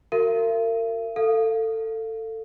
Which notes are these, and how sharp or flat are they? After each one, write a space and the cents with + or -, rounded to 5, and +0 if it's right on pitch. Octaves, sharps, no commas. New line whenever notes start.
F#4 +0 A#4 -35 E5 +45
A4 +20 F5 +0